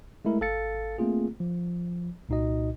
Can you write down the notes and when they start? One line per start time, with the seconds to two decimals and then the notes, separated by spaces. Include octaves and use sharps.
0.25 G#3 A3 E4 A#4
0.41 G#1 A4 F5 A6 C#7
0.98 A3 A#3 C4 F4 G#4
1.40 F3
2.29 C2 A#2 D#4 F#4 D#5